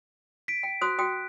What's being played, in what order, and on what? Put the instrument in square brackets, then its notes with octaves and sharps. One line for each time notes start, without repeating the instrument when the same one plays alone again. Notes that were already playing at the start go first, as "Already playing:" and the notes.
[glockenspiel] B6 D7
[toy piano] G5
[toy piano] F#4 C5 D#6 [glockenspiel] F#6
[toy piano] F#4 G5 D#6